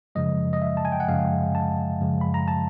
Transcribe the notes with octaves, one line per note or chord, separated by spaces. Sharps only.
F#2 C#3 F3 G#3 D#5
D#5
E5
A5
G#5
G5
F#5
F#2 C#3 F3 G#3 F5
A5
F#2 C#3 F3 G#3
B5
A#5
A5